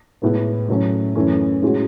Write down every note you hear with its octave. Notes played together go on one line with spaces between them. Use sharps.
A2 G#3 B3
A2 F#3 A3 C#4
F#2 E3 A3 C#4
A2 G#3 C#4 F#4